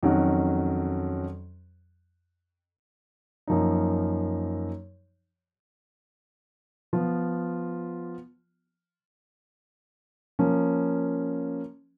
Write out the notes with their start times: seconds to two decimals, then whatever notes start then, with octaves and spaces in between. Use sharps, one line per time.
0.03 F2 D#3 F#3 C#4 F#4
3.48 F#2 F3 A#3 D#4
6.93 F3 B3 F4
10.39 F3 A#3 C#4